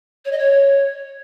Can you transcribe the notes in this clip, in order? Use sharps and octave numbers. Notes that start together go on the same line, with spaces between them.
C#5
D#5
C#5